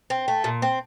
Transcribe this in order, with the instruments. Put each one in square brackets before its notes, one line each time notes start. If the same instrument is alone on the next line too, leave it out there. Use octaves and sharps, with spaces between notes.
[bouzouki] C4
A3
A#2
C4